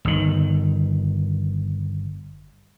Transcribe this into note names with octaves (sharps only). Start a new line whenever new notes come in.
G1 D#3